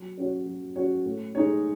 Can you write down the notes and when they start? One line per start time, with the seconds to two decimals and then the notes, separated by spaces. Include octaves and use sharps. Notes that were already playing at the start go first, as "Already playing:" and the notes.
Already playing: F#3
0.17 C#4 F#4 C#5
0.46 F#3
0.76 C#4 F#4 C#5
1.05 A2
1.35 G#3 D#4 A4 C#5